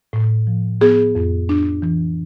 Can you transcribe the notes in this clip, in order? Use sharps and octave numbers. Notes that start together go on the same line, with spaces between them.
A2
F3
B3 G#4
F2
D4
E3